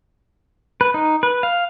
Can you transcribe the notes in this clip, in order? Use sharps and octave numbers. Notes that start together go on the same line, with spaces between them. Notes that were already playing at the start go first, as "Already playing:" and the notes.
B4
D#4
B4
F5